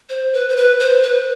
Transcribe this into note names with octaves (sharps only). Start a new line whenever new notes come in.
C5
B4
C5
B4
C5
B4